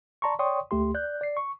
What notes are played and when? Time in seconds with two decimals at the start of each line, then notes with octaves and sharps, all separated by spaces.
0.22 D5 A5 A#5 C6 C#6
0.39 C#5 D5 G5 C6 C#6 D#6
0.71 D2 A3 G4 C6
0.94 D5 F#6 G6
1.21 D5 C7
1.37 C#6